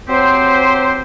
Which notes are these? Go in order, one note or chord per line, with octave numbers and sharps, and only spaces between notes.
F#3 C4 G4 C5